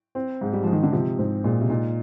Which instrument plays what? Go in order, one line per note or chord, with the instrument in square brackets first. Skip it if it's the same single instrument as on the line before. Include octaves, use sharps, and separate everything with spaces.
[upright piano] C4
G#2
[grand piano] G3
[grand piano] F3 [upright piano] G#3
[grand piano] D#3
D3
[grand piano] C3 [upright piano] F3
[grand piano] G#2 [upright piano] C4
[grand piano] A#2 [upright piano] G#3
[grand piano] C3
[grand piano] A#2 [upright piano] D#4